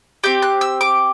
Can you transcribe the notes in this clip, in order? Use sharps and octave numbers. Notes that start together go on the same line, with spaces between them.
C4 G4 G6
F#6
E6
D6